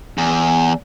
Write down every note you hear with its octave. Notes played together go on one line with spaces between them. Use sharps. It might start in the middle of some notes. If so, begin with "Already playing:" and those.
E2